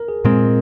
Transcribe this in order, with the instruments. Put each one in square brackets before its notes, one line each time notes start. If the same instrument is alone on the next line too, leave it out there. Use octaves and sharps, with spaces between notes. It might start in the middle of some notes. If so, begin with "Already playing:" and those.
Already playing: [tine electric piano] A#4
G#4
[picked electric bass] A#2 G#3 C4 [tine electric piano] A#4